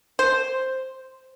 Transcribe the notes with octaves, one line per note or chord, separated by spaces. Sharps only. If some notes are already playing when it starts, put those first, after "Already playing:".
C5